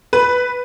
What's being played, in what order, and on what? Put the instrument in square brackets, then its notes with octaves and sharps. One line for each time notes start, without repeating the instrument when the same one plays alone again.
[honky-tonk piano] B4